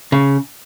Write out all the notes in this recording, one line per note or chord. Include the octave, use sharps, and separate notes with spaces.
C#3